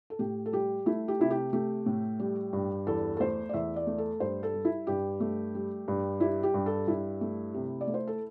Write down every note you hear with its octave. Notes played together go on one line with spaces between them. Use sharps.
A4
A2 G4
A4
G3 G4
A3 E4
G4
C3 E4
G4
A3 G4
A2
G3
G2
E2 A4
A4
A3 C5
D5
E2 E5
D5
A3
A4
G2 C5
A4
G3
E4
G2 G4
A3
G3
G2
G3 E4
G4
G2
A4
G2 E4
A3
C3
D5
A3
C5
A4